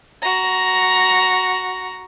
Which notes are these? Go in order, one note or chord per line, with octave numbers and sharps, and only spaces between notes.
F#4 A#5